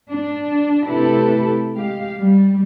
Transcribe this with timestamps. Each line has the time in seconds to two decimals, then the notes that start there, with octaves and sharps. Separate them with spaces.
0.11 D4
0.87 C3 A3 E4 G4 A4 B4
1.74 G#3 G4 F5
2.18 G3